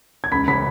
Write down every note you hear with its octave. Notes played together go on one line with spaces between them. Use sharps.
G#6
C#2 B5 B6
C#3 B5 B6